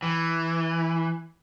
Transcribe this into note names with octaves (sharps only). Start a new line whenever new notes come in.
E3